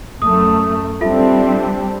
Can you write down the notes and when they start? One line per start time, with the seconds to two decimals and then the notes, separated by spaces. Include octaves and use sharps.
0.22 F#2 A3 D#6
1.01 G3 C4 D4 F4 A4 E5